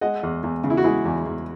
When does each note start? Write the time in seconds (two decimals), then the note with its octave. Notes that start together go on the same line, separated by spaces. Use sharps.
0.01 G#3 D#5 F#5
0.23 E2
0.43 E2
0.64 C#3
0.70 E4
0.77 F#4
0.84 G#3 E4 G#4
1.05 E2
1.26 E2